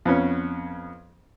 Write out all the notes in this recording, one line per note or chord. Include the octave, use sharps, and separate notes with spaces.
F2 B3 C#4